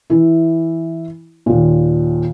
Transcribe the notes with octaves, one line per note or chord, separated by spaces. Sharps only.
E3 E4
D#2 A#2